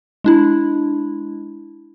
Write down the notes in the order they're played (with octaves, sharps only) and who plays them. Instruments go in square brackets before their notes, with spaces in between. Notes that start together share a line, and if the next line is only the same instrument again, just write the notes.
[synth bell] G#3 D4 E4